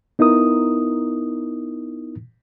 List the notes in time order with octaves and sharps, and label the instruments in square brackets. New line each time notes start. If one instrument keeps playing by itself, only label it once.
[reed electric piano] B3 D#4 E4 A#4 D#6